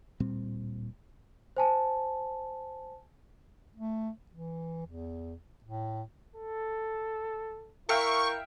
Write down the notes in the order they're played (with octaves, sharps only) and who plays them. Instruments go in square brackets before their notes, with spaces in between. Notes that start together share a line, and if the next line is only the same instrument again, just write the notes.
[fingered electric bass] D1 A#2 G3 C4
[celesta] C5 G#5 A5
[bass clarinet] A3
E3
E2
A2
[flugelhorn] A4
[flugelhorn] E4 [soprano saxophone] A#4 [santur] E5 F5 G5 [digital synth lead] C#6